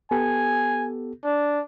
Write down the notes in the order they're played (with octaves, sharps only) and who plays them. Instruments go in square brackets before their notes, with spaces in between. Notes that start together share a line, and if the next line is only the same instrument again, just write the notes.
[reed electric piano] B3 G4 A4 [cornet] G#5
[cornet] D4